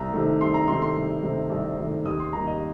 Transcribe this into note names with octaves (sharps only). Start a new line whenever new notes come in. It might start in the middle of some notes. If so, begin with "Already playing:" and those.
Already playing: C2 A#5
C3 D#3 A3
C2 C6
A#5
C3 D#3 A3 C6
C6
C2
C3 D#3 A3
C2
C3 D#3 A3
D#2 D#6
C6
D#3 G3 A#3 A#5
D#5